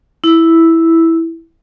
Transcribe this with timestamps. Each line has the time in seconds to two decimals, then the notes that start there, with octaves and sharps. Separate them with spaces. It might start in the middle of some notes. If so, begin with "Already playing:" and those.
0.24 E4 E6